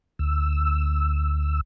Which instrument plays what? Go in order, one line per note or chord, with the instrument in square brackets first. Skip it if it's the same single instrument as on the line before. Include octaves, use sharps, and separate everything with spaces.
[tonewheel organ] D2 E6